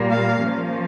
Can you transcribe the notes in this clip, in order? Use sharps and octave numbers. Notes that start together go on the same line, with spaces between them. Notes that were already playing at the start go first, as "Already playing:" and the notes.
Already playing: A#2 G3 A#3
F5
F3 A#3 C#4